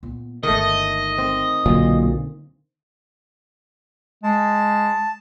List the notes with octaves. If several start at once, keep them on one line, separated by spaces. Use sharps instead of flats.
A#2 B3
G1 D#3 G#3 A3 D#5
C4
B1 A#2 D3
G#3 A5